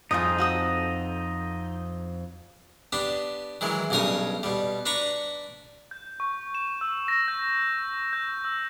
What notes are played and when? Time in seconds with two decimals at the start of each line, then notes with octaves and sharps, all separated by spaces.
0.11 F2 D#4 F4 G#4 D#6 G6
0.38 F#4 A4 D#6
2.92 B3 D4 G4
3.61 D#3 E3 F#3 G#3
3.90 B1 G2 C#3 A#4 C#5 D#6
4.43 B2 G3
4.86 D4 B4 A#5 C#6
5.91 G6
6.20 C#6
6.55 E7
6.81 E6
7.08 A#6
7.28 G6
8.13 G6
8.45 E6